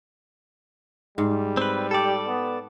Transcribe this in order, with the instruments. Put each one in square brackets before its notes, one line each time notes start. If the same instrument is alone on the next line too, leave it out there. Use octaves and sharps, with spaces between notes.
[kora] G#2 [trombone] G3
[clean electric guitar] C4 B4
[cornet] G4 [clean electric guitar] A4 D5
[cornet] B3